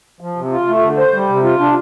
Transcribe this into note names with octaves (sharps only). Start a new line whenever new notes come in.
F3
C3
F4
A3
D3
C5
G3
C3
F4
D4